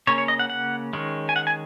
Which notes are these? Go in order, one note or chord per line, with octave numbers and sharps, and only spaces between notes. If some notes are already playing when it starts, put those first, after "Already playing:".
C#3 A#3 C#4 C#5
C#5
D#5
F#5
F#5
D#3 G#3 C#4
G#5
F#5
G#5